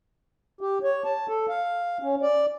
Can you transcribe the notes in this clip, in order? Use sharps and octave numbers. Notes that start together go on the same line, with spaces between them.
G4
C#5
A5
A4
F5
C#4
D5